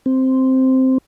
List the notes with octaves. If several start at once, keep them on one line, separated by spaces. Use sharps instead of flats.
C4